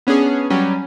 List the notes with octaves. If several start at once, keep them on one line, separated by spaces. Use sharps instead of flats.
B3 C#4 D4 G#4
F#3 G3 C#4